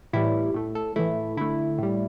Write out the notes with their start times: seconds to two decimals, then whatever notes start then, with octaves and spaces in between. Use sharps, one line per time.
0.13 A2 E3 G3 E4
0.54 A2 A3
0.75 A4
0.96 A2 E3 A3 E4
1.37 D3 A3 E4
1.79 A2 G3